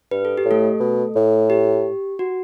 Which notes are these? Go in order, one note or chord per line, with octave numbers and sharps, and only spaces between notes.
G2 B4
A4
G4
A2
A3 A4
B2
A2
G4
F#4